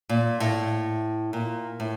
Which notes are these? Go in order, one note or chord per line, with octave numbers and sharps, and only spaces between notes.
A#2
A2
A#2
A2